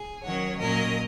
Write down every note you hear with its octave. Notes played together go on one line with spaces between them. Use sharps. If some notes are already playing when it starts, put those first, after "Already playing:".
Already playing: G#4
D#3 F#3 C#4 C#5 F#5
A#2 F#3 C#4 A#4 D#5